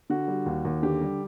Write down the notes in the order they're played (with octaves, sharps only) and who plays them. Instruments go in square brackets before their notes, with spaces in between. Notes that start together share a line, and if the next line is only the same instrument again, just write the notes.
[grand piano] D3 F#4
G3
D#2
D#2
D3 G4
G3